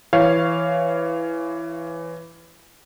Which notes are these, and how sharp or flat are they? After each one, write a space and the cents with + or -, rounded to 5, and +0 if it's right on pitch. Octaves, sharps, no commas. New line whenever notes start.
E3 +10 C#5 +0 F5 -10